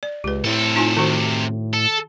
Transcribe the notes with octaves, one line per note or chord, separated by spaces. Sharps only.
D5
C#2 G4 B4
A2 C3 A4
D#4 F4 G#5
D#3 F#4 C5
A4